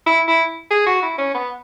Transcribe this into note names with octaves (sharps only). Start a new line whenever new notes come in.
E4
E4
G#4
F#4
E4
C#4
B3